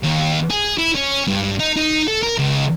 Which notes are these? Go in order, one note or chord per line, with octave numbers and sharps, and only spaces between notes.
D#2
G#4
E4
C#4
G2
D#4
D#4
A4
A#4
C#2